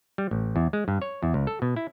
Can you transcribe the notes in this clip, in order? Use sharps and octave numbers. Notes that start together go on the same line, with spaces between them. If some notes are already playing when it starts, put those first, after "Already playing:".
G3
A1
E2
G#3
G2
C#5
E2
C#2
A4
B2
E4